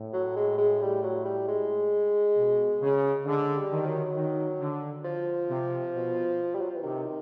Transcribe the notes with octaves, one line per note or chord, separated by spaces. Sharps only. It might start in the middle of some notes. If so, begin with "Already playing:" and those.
Already playing: A2
F#3
G#3
G#3
G3
F#3
G3
G#3
B2
C#3
D3 G#3
G3
D#3
F#3
D#3
D3
F3
C3
B2
G3
F#3
F3
E3
C3 D#3